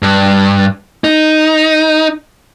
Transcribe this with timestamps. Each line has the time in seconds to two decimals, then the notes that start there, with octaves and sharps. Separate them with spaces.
0.02 G2
1.04 D#4